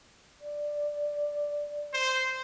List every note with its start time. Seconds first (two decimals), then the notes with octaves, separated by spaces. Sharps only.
0.41 D5
1.94 C5